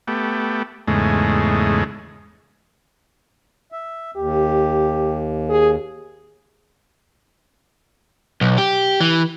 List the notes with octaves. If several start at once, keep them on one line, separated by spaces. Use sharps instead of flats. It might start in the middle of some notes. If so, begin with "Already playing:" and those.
A3 B3 G4
E2 G#2 C#3 G#3 A3
E5
D#2 G4
G#4
B1
G4
E3